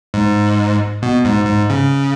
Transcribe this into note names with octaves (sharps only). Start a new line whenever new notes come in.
G#2
B2
G#2
G#2
C#3